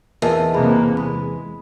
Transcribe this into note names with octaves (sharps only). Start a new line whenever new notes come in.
E2 A#4 D#5 A5
C3 A#3 B3 G#4 B5
G#3 B5